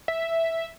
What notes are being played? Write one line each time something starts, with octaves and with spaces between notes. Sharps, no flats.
E5